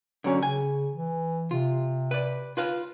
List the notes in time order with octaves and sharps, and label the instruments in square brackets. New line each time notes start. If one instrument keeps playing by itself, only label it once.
[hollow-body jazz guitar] D3 F#3 C#4
[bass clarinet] C#3 [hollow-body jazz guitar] G#5
[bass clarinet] E3
[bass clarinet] C3 [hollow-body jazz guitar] F4
[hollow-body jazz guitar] B4 D5
F4 B4 F5